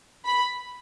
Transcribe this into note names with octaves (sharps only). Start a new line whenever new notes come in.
B5